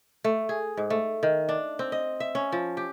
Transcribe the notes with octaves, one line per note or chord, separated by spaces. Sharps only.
A3
G#4
G#2
A3
D#3
D4
C4
D#5
E5
C#4
F3
G4